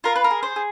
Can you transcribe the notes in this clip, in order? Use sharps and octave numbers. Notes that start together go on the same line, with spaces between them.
F4 A#4
B4
A#4
G#4
C5
G#4